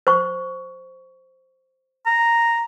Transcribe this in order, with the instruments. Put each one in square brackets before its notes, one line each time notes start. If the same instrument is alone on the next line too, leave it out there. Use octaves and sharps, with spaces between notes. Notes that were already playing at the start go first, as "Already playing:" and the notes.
[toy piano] C5 C#6
[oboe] A#5